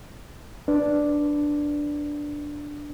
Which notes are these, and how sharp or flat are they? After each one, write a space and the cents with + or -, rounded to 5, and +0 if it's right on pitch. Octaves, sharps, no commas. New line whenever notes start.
D4 +0 B4 +0 D5 +0